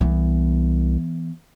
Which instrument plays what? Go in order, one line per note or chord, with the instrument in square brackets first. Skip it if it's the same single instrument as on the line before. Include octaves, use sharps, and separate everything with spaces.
[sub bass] C2 [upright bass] E3 B3